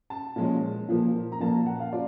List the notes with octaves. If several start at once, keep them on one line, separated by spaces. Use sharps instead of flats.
A5
A#2 F3 G#3 C#4
A#2 F3 A#3
A#5
A#2 F3 A#3 A5
F#5
F5
F4 D5